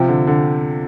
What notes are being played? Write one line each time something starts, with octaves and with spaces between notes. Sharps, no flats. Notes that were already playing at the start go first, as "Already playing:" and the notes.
Already playing: C3 F3 G5
D3
D3